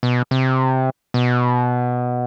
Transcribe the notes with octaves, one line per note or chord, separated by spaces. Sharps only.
B2
C3
B2